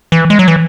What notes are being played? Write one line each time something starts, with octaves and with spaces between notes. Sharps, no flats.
E3
G#3
F#3
E3